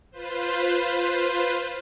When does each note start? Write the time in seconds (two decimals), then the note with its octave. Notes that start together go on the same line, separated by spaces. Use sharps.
0.12 F4 B4 C5